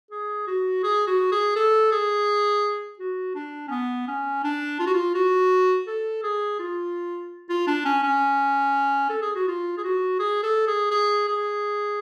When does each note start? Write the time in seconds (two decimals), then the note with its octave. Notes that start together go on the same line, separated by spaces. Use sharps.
0.11 G#4
0.47 F#4
0.83 G#4
1.07 F#4
1.32 G#4
1.56 A4
1.92 G#4
2.99 F#4
3.35 D4
3.68 C#4
3.71 B3
4.08 C#4
4.44 D4
4.80 F4
4.87 F#4
4.94 F4
5.15 F#4
5.87 A4
6.23 G#4
6.59 F4
7.49 F4
7.67 D4
7.85 C#4
8.03 C#4
9.10 A4
9.22 G#4
9.35 F#4
9.48 F4
9.78 G#4
9.84 F#4
10.19 G#4
10.44 A4
10.68 G#4
10.91 G#4
11.28 G#4